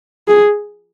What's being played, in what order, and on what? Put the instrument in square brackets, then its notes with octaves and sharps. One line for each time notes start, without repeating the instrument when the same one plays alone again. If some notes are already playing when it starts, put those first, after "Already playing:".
[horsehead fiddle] G#4